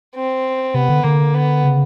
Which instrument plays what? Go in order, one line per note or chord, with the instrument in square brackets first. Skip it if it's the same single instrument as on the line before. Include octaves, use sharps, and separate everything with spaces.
[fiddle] C4
[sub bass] C3 [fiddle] B3
[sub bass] D3
[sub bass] D3 [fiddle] A#3
[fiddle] B3
[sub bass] C#3